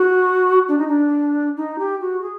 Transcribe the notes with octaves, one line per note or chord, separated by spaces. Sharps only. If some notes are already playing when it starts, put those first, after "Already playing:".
Already playing: F#4
D4
D#4
D4
D#4
G4
F#4
G#4